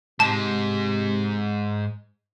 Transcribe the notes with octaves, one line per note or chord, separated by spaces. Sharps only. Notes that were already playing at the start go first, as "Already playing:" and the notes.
G#2 C3 G#3 A5